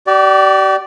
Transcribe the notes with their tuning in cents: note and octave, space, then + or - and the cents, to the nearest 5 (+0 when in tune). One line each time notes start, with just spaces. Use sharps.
G4 -40 D5 +0